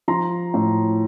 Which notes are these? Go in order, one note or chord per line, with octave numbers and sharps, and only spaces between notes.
F3 A#5 C6
A2